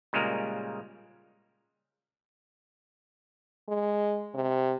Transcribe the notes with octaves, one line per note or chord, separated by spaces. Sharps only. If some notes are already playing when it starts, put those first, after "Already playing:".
A#2 C#3 G3 G#3 A#3 A#4
G#3
C3